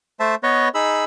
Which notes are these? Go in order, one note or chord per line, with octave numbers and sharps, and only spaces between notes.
A3 C5 E5 A5
B3 B4 C#5 D#5
D#4 G#4 B5 E6